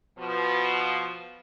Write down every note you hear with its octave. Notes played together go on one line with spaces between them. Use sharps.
B2 F3